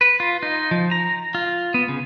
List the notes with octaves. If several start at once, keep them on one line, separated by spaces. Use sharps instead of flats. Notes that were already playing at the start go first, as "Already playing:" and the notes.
B4
F4
D#4
F3
A#5
F4
B3
C#3